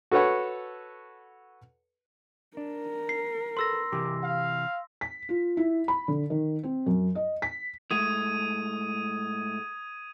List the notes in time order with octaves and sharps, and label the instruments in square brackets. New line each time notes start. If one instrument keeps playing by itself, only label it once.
[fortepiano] F#4 A4 B4 C#5 F#5
[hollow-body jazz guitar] D4 [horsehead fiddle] A#4
[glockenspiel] C7
[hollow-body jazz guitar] A4 B4 [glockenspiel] C6 E6 A#6
[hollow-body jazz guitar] C3 E3 G4 [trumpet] D6
[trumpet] F5
[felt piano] B6
F4
E4
B5
D3
D#3
C4
F#2
D#5
B6
[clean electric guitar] A2 G#3 A3 [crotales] D#6 G#6 D#7